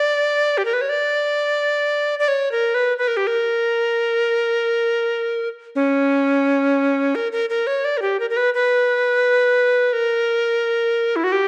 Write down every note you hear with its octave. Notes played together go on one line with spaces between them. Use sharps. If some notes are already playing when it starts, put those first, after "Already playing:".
Already playing: D5
G4
A#4
B4
C#5
D5
D5
C#5
A#4
B4
B4
A#4
G4
A#4
C#4
A#4
A#4
A#4
C#5
D5
A#4
G4
A#4
A#4
B4
B4
A#4
E4
F#4
G4